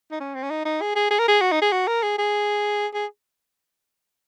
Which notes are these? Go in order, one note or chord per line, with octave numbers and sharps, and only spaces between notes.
D#4
C#4
C4
C#4
D#4
D#4
G#4
G#4
G#4
A#4
G#4
F#4
D#4
G#4
F#4
A#4
G#4
G#4
G#4